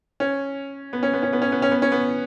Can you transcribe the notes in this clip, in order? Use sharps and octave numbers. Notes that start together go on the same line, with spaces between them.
C#4
B3
C#4
B3
C#4
B3
C#4
B3
C#4
B3
C#4
B3